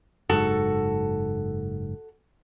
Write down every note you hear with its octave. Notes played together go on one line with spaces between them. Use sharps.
F#1 G#2 F#4 A4